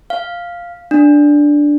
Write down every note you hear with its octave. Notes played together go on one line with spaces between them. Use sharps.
F5
D4